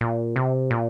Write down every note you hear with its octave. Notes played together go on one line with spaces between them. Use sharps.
A#2
C3
A#2